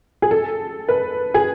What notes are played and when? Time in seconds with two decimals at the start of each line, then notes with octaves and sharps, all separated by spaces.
0.22 G#4
0.31 A4
0.89 B4
1.34 G#4